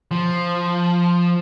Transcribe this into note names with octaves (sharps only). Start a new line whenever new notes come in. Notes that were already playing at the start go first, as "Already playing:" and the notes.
F3